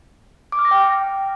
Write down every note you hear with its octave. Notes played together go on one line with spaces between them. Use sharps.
D6
F6
A#6
G5
F6